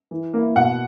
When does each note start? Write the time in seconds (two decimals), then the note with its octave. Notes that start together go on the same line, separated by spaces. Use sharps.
0.11 E3
0.34 A#3 E4
0.56 B2 F#5